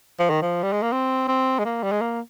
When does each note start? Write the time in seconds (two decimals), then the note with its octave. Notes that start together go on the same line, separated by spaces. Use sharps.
0.19 F3
0.30 D#3
0.41 F3
0.63 G3
0.73 G#3
0.82 A#3
0.92 C4
1.28 C4
1.59 G#3
1.65 A#3
1.83 G3
1.92 G#3
2.01 A#3